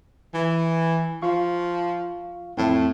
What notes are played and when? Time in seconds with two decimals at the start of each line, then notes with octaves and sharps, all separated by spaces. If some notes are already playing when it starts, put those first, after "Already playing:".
0.34 E3
1.22 F3 F4 F5 C#6
2.57 F2 A2 C4